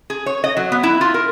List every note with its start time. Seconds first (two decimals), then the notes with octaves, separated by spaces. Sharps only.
0.10 G#4
0.26 C#5
0.44 D#5
0.57 F#3
0.72 B3
0.83 E4
1.01 F4
1.14 A#4